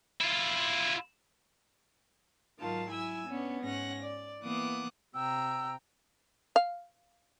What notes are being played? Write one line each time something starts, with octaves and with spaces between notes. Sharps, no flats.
E4 F4
G#2 D#3 F#3 F4 A5
F#3 E4 G#5 E6
B3 C#4 D4
G#2 C#4 F#5 A#6
D5
E3 A#3 B3 D6 D#6 F#6
C3 G5 A#5 E6
F5